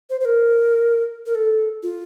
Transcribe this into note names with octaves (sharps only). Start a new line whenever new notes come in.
C5
C5
A#4
A#4
A4
F4